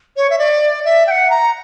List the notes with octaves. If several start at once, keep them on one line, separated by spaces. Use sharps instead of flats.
C#5
E5
D5
E5
G5
F#5
A#5